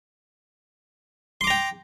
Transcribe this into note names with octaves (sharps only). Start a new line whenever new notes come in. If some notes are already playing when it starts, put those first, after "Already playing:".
G5 A#5 C6 D6